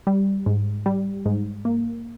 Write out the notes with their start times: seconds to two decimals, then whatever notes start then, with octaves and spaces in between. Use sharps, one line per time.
0.07 G3
0.46 G#2
0.86 G3
1.26 G#2
1.65 A#3